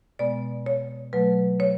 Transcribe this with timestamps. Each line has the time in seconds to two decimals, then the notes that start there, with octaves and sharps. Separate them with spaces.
0.19 B2 G#3 B3 D5
0.66 C#5
1.13 B2 F#3 A3 B4
1.60 C#5